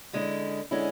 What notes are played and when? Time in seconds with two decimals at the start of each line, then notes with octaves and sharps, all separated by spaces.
0.13 D3 G#3 C#4 E4
0.71 D3 G#3 C#4 E4